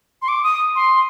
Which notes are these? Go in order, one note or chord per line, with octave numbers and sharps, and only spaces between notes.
C6
D6
D#6
C6